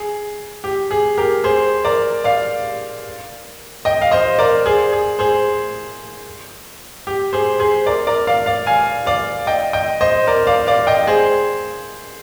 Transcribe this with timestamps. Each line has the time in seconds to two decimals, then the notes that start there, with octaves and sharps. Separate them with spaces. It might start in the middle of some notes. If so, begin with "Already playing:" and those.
Already playing: G#4
0.64 G4
0.91 G#4
1.18 G4 A#4
1.44 G#4 C5
1.85 A#4 D5
2.24 D5 F5
3.85 D#5 G5
4.02 F5
4.11 C5 D#5
4.39 A#4 D5
4.66 G#4 C5
4.92 G#4
5.19 G#4 C5
7.07 G4
7.33 G#4 C5
7.60 G#4 C5
7.86 A#4 D5
8.07 A#4 D5
8.27 D5 F5
8.46 D5 F5
8.67 F5 G#5
9.06 D5 F5
9.47 D#5 G5
9.73 D#5 G5
10.01 C5 D#5
10.27 A#4 D5
10.47 D5 F5
10.67 D5 F5
10.87 D#5 G5
11.07 G#4 C5